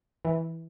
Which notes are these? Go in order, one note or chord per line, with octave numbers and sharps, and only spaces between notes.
E3